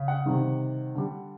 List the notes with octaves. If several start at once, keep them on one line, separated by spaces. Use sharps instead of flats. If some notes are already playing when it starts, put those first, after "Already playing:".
Already playing: C#3
F#5
C3 D#3 G3
D3 G3